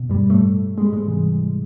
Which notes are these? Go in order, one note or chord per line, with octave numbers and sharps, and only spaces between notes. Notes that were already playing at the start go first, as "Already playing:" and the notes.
Already playing: B2
G2 G3
A2 A3
G#3
G3
G#2 G#3
C3 E3